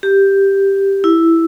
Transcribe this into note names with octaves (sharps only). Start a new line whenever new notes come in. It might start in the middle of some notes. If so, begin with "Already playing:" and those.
G4
E4